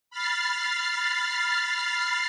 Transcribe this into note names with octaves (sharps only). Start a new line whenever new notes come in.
B5 F6 A6 C7